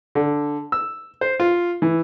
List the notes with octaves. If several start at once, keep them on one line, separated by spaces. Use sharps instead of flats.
D3
E6
C5
F4
E3